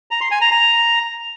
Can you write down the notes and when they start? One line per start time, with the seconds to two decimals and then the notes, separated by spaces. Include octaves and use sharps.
0.11 A#5
0.21 C6
0.31 G#5
0.41 A#5
0.51 A#5